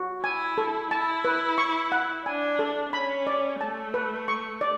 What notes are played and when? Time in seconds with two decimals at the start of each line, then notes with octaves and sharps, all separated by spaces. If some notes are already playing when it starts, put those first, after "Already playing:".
Already playing: F#4
0.24 E4 G#5
0.58 A4
0.91 E4 A5
1.25 B4
1.58 C#6
1.92 F#5
2.26 D4 G#5
2.59 A4
2.93 C#4 B5
3.27 D5
3.60 A3 A5
3.94 B4
4.28 C#6
4.61 D5